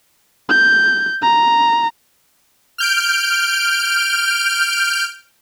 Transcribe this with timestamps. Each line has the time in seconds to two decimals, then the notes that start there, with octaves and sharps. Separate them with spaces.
0.49 G6
1.22 A#5
2.78 F6 G6 D7